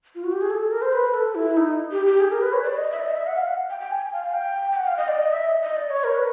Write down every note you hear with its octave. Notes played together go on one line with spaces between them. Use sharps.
F4
F#4
G4
G#4
A4
A#4
C5
B4
A4
E4
D#4
G4
G4
G#4
A#4
B4
C#5
D5
D#5
E5
D5
D#5
E5
F#5
F5
F#5
G5
G5
G#5
G5
F5
F5
G5
G5
F#5
F5
D#5
D5
D#5
E5
D#5
D#5
D5
C#5
A#4
B4